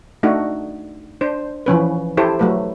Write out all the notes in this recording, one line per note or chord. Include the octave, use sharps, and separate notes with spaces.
A3 D4 D#4 F#4
D4 C5
E3 F3 C#4 B4
E4 G4 A4 C5
F#3 A3 B4